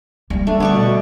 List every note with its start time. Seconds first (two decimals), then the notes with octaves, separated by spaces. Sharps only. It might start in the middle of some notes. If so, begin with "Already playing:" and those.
0.30 G3 A#3
0.47 A3 D4
0.60 D3 B3 D5 C#6
0.74 B2